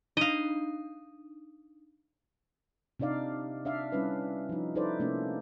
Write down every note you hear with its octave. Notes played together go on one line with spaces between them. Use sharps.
D4 D#4 D#5 F5
C3 D4 D#4 D5 F5
D4 D5 E5 F5
G3 C#4 D4 E4 B4
F3 D#4
D#4 E4 A4 B4 C5 D5
C3 A3 A#3 C#4 D4